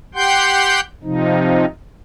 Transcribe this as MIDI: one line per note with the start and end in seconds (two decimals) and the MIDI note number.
0.15 0.80 67
0.15 0.80 78
0.15 0.80 79
0.15 0.80 84
0.15 0.80 91
1.04 1.65 48
1.04 1.65 53
1.04 1.65 63